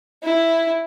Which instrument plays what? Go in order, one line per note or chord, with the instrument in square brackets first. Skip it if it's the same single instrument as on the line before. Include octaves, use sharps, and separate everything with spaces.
[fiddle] E4